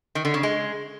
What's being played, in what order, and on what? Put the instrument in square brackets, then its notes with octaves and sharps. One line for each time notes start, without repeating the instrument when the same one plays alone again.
[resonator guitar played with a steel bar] D#3
D3
C#3
G#3